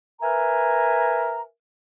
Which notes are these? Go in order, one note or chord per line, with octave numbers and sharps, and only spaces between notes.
A#4 B4 E5 G#5 A#5